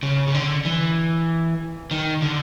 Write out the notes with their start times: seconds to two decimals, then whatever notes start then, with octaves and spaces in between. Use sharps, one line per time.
0.03 C#3
0.28 C#3
0.34 D3
0.65 E3
1.91 D#3
2.22 D3